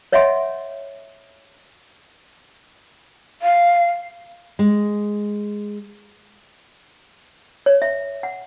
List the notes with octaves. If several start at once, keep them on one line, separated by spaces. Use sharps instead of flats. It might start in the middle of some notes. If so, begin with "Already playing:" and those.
C#5 D#5 E5 F#5 G#5 C6
F5
G#3
C#5
E5
F#5